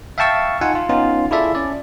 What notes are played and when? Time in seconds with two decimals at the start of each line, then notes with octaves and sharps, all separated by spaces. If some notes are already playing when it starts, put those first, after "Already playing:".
0.18 E5 F5 G5 A5 C#6 E6
0.61 D#4 F4 F#5 G#5
0.75 F4
0.89 B3 C#4 D#4 F4
1.31 E4 F4 G#4 A4 D5 E5
1.55 C#4 D5